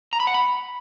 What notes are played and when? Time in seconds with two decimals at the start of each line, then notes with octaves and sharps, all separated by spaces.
0.13 A#5
0.20 B5
0.27 F#5
0.34 B5